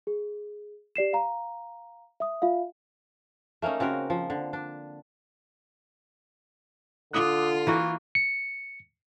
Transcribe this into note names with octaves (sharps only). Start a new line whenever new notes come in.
G#4
G4 D5 C7 E7
F5 A#5
E5 D#6
F4 E5 F5
A3 A#3 C#4 D#4
C#3 C4 F#4 A#4
F3
D3
D4
D3 F4 D6 D#6 F#6
E3 A#3 E4 F#4
C#7